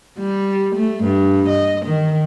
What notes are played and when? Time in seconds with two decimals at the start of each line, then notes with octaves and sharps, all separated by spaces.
0.19 G3
0.75 A3
1.04 G2
1.48 D#5
1.85 D#3